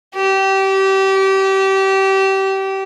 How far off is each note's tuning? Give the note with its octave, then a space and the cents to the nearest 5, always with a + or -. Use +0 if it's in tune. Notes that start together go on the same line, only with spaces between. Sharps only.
G4 -25